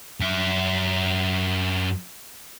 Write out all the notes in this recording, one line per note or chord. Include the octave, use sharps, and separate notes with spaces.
F#2 E5